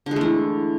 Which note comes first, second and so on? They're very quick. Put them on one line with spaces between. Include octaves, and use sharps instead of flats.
D3 G#3 A3 E3